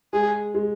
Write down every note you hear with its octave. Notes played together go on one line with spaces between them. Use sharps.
G#3 G#4
G#3